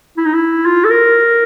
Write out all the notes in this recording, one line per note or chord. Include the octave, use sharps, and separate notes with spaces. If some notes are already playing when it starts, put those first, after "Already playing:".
E4
D#4
E4
F4
A4
A#4